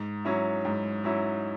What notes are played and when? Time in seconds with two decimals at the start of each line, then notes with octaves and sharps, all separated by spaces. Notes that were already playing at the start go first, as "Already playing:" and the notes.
Already playing: G#2
0.25 F#3 C#4 E4
0.65 G#2
1.04 F#3 C#4 E4